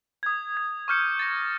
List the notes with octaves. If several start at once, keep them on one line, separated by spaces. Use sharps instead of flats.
D#6 G#6
G#6
C#6 D6 F6 G6 C#7
A6 A#6